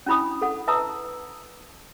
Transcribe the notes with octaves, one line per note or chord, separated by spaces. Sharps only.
C#4 D4 E4 B5 D#6
A4 F#5
B4 E5 A5 A#5 D#6 E6